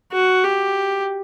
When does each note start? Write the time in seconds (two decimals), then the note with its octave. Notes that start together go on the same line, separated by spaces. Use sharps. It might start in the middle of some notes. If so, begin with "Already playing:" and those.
0.12 F#4
0.44 G4